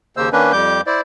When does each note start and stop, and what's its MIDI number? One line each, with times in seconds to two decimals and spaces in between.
0.17 0.29 39
0.17 0.29 49
0.17 0.29 58
0.17 0.29 72
0.17 0.29 88
0.33 0.52 51
0.33 0.52 58
0.33 0.52 61
0.33 0.52 62
0.33 0.52 71
0.52 0.81 41
0.52 0.81 55
0.52 0.81 86
0.52 0.81 91
0.87 1.01 64
0.87 1.01 72
0.87 1.01 74